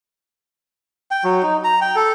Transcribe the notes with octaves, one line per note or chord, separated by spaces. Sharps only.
G5
F#3
D#4
A#5
G5
A4